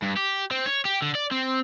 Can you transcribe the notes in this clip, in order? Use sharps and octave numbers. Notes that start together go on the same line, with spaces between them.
G2
G4
C4
C#5
G4
D3
D5
C4